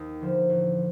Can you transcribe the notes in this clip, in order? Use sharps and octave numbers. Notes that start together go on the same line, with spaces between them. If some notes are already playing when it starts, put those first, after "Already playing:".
Already playing: D#2 D#4
D3 F3
A1